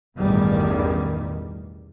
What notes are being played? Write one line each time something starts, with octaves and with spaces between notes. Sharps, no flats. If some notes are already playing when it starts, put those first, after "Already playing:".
A1 E2 G2 B2 D#3 G3